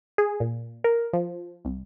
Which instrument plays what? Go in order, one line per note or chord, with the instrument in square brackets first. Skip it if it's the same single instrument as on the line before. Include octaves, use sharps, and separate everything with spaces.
[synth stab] G#4
A#2
A#4
F3
C2